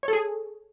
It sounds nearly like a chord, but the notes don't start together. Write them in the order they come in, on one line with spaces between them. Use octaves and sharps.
C#5 A4 G#4